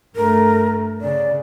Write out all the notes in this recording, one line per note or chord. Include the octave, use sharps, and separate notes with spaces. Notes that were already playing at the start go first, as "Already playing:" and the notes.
G2 A3 A#4
C#3 D5